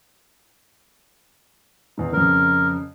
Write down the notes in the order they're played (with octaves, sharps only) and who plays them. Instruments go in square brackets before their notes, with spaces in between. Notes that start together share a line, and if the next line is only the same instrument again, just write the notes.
[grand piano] E2 G#2
[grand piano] F2 C#3 [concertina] A#4